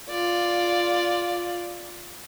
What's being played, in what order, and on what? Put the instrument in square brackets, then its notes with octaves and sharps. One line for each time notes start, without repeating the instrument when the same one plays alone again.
[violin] F4 D5